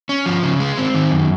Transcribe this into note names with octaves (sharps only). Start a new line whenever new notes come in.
C#4
F3
C#3
G#3
C4
D#3
F#2